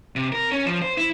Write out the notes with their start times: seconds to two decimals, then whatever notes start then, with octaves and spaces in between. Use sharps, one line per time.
0.16 C3
0.32 A#4
0.52 C#4
0.66 F3
0.82 C5
0.98 E4